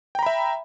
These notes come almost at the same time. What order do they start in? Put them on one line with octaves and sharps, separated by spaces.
G5 A#5 B5 E5